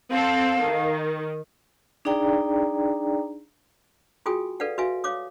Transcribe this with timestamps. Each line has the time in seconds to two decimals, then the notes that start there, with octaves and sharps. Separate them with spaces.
0.11 C4 A4 F5
0.63 D#3
2.05 D4 D#4 G#4 D5 G5 A#5
4.26 F4 F#4 G#4 G5 G#5 D#6
4.60 A4 B4 D5 F5 F#5
4.78 F#4 B4 E5 F5 G#5
5.04 C#5 F5 D6 D#6